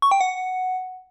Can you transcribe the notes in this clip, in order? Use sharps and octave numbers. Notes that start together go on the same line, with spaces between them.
C#6
G5
F#5